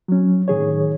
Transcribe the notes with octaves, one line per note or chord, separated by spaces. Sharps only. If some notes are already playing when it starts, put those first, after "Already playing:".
F#3 C#4
A2 D#3 G#4 C#5